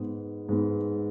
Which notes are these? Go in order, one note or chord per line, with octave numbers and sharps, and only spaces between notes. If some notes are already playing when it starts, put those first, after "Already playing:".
Already playing: G#2 G#3 B3
G#2 G#3 B3